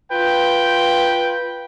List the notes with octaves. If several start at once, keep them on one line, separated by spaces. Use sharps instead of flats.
F4 B4 G5